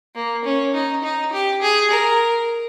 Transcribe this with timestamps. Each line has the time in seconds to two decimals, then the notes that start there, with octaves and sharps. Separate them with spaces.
0.15 A#3
0.44 C#4
0.74 D#4
1.03 D#4
1.32 G4
1.62 G#4
1.90 A#4